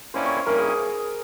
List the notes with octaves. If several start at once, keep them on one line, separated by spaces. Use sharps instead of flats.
G2 G3 A#3 C#4 E4 C5
C#5
C5
G2 G3 A#3 C#4 E4 A#4
G#4
G#4